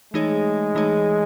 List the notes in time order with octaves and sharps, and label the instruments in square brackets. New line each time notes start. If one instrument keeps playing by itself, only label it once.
[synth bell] E3 A3 D#4 G#4 C#5 [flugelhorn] G#3
[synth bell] E3 A3 D#4 G#4 C#5